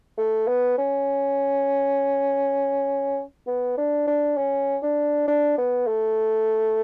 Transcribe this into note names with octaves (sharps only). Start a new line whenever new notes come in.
A3
B3
C#4
B3
D4
D4
C#4
D4
D4
B3
A3